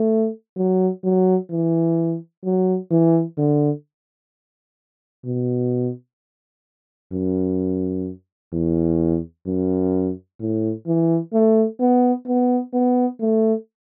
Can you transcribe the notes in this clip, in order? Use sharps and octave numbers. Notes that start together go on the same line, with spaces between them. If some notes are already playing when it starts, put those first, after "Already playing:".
Already playing: A3
F#3
F#3
E3
F#3
E3
D3
B2
F#2
E2
F#2
A2
E3
A3
B3
B3
B3
A3